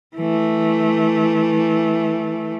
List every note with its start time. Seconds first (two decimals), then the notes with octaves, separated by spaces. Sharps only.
0.17 E3 A3